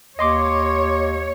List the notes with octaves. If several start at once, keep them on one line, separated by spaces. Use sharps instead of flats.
D#2 C#5 D#5 C6 D6